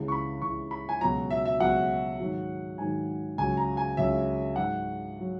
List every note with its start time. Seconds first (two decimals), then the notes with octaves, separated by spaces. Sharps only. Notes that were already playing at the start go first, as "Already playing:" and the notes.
Already playing: C#2 C#3 E3
0.08 C#6
0.12 B5
0.42 C#2 C#3 E3 C#6
0.71 B5
0.89 G#5
1.01 C#2 B2 F#3 A#5
1.30 E5
1.45 E5
1.60 C#2 B2 F#3 F#5
2.20 G#2 D#3 F#3
2.78 G#2 D#3 F#3 G#5
3.38 C#2 C#3 F#3 G#5
3.57 A#5
3.77 G#5
3.97 C#2 C#3 F#3 E5
4.56 G#2 F#3 F#5
5.20 F#3